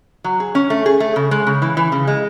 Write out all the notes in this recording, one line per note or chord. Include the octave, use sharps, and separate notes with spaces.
F#3
G#4
C#4
A3
G#4
A3
C#3
G#3
C#3
E3
E3
C#3
G#3